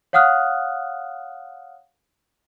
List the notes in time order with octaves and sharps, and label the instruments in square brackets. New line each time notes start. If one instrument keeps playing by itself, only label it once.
[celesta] C#5 F5 F#5 D#6 F6 F#6